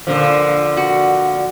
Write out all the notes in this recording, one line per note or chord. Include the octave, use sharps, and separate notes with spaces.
A#2 D3 F3
F#4